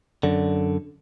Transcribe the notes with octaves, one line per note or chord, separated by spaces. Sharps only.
F#2 D3